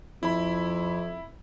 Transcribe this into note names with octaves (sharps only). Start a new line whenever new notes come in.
F2 E4 B5